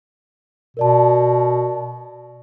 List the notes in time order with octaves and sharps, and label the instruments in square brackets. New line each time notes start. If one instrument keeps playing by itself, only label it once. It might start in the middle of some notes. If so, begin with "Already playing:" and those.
[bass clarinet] B2 [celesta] A#4 D5 A5